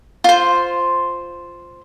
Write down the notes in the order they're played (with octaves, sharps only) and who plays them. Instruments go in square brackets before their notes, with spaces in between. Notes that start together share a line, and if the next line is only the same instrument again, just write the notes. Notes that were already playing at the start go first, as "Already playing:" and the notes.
[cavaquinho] F4 C5